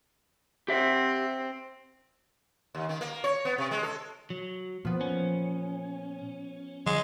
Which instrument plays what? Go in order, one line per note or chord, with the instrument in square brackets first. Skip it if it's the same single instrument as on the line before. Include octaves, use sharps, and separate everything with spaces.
[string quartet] C4 [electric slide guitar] G4 E5 F#5
[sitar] D#2
D#3
A#3
C#5
B3
C3
G#3
A4
[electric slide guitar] F#3
[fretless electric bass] A#2 [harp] F3 B3
[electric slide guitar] C#4
[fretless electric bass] D3 F3 G3 [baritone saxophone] G#3